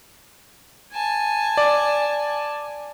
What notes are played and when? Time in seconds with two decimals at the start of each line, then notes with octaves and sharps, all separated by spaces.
0.92 G#5 A5
1.57 D5